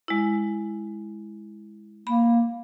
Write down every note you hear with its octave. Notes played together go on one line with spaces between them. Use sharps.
G#3 E4
A#3 B5